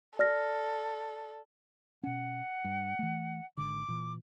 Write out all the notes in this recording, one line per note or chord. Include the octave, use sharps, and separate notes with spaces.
A4 D5 F6 A#6
B2 C#4 F#5
G2
E3 A3
G#1 D3 D6
A#2 E3